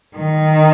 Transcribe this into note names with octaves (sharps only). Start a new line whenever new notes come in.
D#3